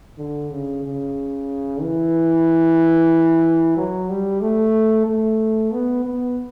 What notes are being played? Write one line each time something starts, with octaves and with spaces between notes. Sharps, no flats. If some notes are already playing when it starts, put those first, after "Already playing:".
D3
C#3
C#3
E3
F#3
G3
A3
A3
B3
B3